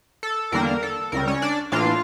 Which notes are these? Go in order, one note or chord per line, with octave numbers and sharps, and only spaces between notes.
A4
E2 D3 G3 A#3 D4 A#4
A4
C#2 C#3 G3 A#4
C#4 C#5
D4 D5
A2 E3 A#3 D4 F4 F5